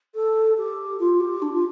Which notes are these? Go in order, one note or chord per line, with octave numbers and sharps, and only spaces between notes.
A4
G4
F4
G4
D4
F4